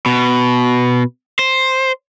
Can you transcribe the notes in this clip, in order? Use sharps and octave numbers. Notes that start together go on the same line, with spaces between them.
B2
C5